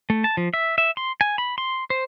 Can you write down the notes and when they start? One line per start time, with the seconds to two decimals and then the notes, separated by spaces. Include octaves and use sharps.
0.10 A3
0.24 A5
0.37 F3
0.54 E5
0.78 E5
0.97 C6
1.21 G#5
1.38 B5
1.58 C6
1.90 C5